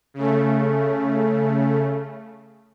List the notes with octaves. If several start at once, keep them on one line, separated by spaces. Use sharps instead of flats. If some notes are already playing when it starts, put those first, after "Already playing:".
C#3 A3